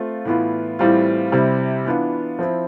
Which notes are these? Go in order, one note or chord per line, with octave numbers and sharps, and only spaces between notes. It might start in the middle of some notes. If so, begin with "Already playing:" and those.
Already playing: A3 C4 F4
A2 E3 B3 F4
A2 E3 G3 C4 F4
C3 G3 C4 E4
E3 B3 D4 F4
F3 C4 E4